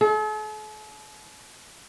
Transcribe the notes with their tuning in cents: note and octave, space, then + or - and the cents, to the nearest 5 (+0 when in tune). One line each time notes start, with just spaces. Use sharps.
A4 -45